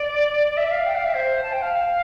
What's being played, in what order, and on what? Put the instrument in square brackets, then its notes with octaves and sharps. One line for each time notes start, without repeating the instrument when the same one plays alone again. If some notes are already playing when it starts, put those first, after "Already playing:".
Already playing: [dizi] D5
E5
F5
G5
F5
E5
C5
A5
G5
F5